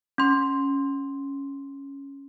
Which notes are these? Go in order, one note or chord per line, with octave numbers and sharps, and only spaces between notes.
C#4 C6